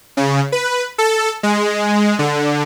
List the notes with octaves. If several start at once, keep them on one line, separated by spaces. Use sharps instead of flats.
C#3
B4
A4
G#3
D3